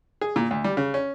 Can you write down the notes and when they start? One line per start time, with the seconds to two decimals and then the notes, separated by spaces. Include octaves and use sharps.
0.21 G#4
0.36 A#2
0.51 D2
0.64 G3
0.77 C#3
0.94 C#4